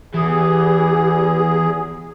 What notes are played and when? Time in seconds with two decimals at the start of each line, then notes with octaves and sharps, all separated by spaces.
0.14 E2 E3 G4 G#4